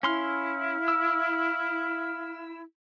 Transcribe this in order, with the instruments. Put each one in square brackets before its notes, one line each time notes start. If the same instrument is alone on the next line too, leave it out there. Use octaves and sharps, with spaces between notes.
[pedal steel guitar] C#4 C6 F6 [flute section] E4 [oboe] F5
[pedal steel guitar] E6